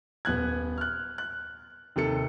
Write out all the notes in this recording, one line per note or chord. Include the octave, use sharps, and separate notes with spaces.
D#1 B3 F#6 G#6
F6 F#6
F#6
D#2 C3 A4 C#7